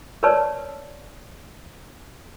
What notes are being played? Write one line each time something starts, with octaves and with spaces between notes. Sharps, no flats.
A#4 B4 C#5 D5 A5